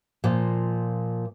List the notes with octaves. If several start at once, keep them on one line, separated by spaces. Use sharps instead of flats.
A#2 F3 A#3